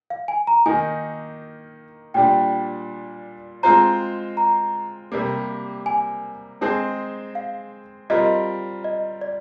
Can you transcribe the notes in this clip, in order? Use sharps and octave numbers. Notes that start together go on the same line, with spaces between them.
F5
G#5
A#5
D#3 A#3 D#4 G#5
A#2 G3 D4 G5
G#3 C4 F4 C5 A#5
A#5
C3 G3 A#3
G#5
G#3 C4 D#4 G#4 C5
F5
G3 C4 F4 A#4 D#5
D#5
D5